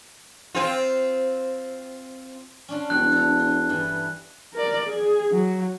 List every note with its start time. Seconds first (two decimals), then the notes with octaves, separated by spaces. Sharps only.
0.55 C4 F4
2.69 C#4 D4 F4
2.90 E1 G3 F#6
3.12 A4 A#5
3.39 F4
3.69 G2 E3
4.54 A#4 D5
4.85 G#4
5.31 F#3